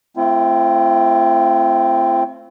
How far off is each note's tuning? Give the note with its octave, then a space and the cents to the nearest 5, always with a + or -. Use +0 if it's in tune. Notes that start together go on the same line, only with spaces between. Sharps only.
A3 +0 C4 +0 F4 -45